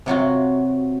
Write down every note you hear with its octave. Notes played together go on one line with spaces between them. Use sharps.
C3 F#3 F4 F#4